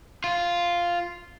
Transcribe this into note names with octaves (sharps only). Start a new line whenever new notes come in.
F4